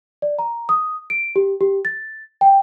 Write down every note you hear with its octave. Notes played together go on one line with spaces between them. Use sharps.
D5
A#5
D#6
D7
G4
G4
A6
G5